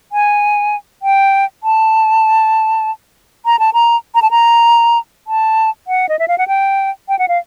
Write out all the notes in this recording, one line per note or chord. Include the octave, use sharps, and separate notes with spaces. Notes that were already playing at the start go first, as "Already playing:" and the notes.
G#5
G5
A5
A#5
A5
A#5
A#5
A5
A#5
A5
F#5
D#5
E5
F5
F#5
G5
G5
F#5
F5